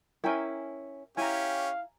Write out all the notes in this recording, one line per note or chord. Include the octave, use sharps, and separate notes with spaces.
C#4 E4 A#4 G5 G#5
C#4 E4 G4 F5 G#5 A#5